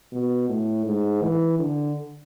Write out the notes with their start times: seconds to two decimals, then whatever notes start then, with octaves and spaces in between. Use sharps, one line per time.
0.12 B2
0.49 A2
0.86 G#2
1.22 E3
1.59 D3